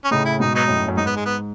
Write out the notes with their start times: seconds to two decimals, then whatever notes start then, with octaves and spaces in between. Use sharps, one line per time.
0.04 C#4
0.11 A2 C#3 D#4
0.25 E4
0.40 G#2 B2 D#4
0.55 F#3 B3 D#4
0.68 F#2 A2
0.88 F#2
0.97 G#2 D#4
1.06 B3
1.16 G#3
1.25 B3